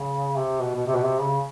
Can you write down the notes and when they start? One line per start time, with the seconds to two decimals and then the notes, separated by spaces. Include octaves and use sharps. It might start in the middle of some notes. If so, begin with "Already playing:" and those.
Already playing: C#3
0.37 C3
0.62 B2
0.75 B2
0.87 C3
0.95 B2
1.04 C3
1.21 C#3